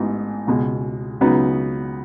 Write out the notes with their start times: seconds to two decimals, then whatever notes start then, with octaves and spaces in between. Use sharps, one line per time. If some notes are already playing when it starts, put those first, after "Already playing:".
Already playing: A1 G#2 E3 B3 D#4
0.47 C#2 B2 G#3
1.21 C#2 C#3 F#3 B3 D#4